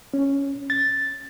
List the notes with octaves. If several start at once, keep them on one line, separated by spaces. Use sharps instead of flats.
C#4
A6